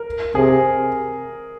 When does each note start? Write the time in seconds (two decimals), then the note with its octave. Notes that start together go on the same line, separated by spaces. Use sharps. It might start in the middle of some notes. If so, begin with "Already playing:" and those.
Already playing: A#4
0.35 C3 G#4